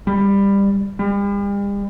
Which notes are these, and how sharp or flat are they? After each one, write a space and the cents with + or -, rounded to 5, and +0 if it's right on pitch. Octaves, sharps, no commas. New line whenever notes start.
G3 +20
G3 +45